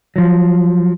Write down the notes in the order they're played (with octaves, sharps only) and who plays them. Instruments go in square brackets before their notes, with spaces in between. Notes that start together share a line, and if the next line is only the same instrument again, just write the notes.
[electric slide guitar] F3 F#3